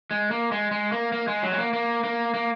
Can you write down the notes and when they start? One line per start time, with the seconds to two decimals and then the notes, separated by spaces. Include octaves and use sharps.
0.11 G#3
0.31 A#3
0.52 G#3
0.71 G#3
0.92 A#3
1.12 A#3
1.28 G#3
1.43 F#3
1.52 G#3
1.58 A#3
1.73 A#3
2.04 A#3
2.34 A#3